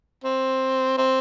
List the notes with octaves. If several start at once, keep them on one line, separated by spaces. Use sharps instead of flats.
C4
C4